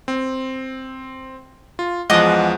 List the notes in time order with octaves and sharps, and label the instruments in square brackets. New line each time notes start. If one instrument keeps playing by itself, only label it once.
[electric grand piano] C4
F4
[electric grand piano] E2 F3 G#3 [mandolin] D#5 F#5 D6